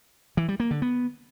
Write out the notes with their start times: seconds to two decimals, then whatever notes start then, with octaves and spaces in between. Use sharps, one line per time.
0.37 E3
0.48 G3
0.60 A#3
0.71 D3
0.82 B3